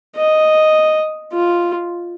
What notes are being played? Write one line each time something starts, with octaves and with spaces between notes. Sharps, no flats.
D#5
F4